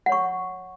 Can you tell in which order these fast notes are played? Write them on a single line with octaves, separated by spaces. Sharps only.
F#5 C#5 C#6